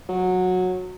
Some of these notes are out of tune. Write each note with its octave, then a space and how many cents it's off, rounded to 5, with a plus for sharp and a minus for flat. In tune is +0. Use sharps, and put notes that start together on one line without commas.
F#3 -15